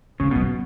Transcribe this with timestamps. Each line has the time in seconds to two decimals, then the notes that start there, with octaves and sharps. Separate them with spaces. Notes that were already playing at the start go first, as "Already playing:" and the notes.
0.20 C#3 G#3
0.31 B2 F#3